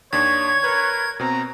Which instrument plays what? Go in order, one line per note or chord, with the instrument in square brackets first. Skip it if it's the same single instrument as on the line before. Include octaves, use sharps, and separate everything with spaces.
[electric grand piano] D#2 D4 C#6 [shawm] C#5 [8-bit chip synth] G#6
[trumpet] A#4 [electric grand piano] B4 F#6
[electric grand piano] B2 C4 [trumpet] A#5